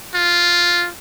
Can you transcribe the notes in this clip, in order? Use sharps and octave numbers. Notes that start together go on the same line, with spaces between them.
F4